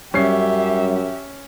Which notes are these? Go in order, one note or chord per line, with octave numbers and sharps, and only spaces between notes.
F#2 F#3 G3 C#4 G4 E5 C7